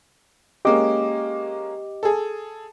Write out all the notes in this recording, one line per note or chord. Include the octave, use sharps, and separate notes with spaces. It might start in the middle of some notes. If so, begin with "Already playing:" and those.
G#3 A#3 C#4 G4 D#5 D6
G#4 A4